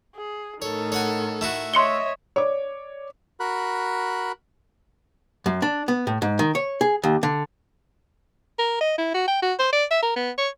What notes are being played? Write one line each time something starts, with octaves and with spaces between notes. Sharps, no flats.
G#4
A2 D#3 A4 C#5
C#5 F#5 G#5
A3 E4 F#4
C#5 D#5 E5 C6 C#7 G7
C#5 D5 D6
F#4 A#4 B5 F#6
F#2
D4
B3
A2
G#2
D#3
C#5
G#4
D#2
D3
A#4
D#5
E4
F#4
G5
F#4
C5
D5
E5
A#4
B3
C#5